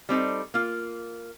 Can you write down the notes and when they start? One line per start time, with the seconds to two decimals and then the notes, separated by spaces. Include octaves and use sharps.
0.09 G3 C4 D#4 A4
0.54 A#3 F4